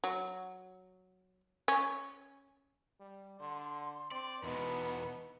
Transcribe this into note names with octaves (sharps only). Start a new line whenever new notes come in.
F#3
C#4
G3
D3 C6
C4 D5
E2 B2 B3 D#4